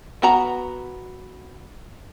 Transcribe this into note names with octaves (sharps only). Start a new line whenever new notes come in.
B3 F#4 A#5